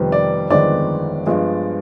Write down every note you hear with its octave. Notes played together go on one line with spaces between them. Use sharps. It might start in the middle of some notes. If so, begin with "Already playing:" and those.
Already playing: F1 F2 D#3 G3 B3
D5
G1 F2 D#3 G#3 B3 D5
G2 F3 G#3 B3